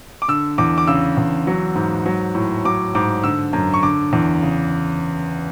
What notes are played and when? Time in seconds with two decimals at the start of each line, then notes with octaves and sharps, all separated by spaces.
0.22 D6
0.28 D3 E6
0.58 E2 D6
0.78 D6
0.87 C#3 E6
1.17 E2
1.47 F#3
1.76 G#2
2.06 F#3
2.35 A2
2.65 F#3 D6
2.95 G#2 D6
3.23 D3 E6
3.53 F#2
3.74 C#6
3.83 D3 D6
4.13 E2
4.42 C#3